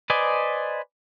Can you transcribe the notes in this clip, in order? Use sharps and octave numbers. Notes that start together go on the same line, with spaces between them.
B4 C5 D5 D#5 G#5